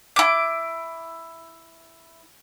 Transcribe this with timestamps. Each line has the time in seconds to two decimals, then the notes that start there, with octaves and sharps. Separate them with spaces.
0.16 E4 D6